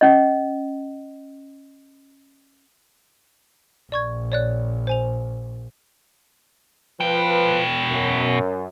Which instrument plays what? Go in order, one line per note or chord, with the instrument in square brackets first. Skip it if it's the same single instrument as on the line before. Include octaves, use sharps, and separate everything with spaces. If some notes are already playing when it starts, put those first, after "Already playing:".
[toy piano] C#4 D#5
[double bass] A#1 [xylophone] D5 C#6 G#6
[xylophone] C#5 D5 F#6
C5 G#5 F7
[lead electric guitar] B2 G5 [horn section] F3 B4
[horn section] F#2